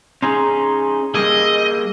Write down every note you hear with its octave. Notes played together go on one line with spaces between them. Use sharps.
C#4 D#4 G#4 G#5 A#5 C6
G3 A#3 G#4 D#5 E6